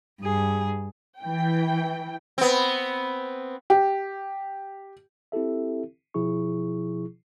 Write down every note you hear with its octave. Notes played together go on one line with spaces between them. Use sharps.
G2 G#4
E3 G5
B3 C4
G4
C4 E4 G4 A4 E5
B2 F3 E4 G#4 C#6